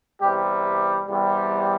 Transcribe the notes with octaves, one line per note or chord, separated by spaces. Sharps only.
E2 C3 G3 G4
G4
E2 C3 G3